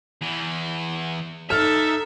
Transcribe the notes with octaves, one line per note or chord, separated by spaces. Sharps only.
E2 E3
D#4 A4 E5 F6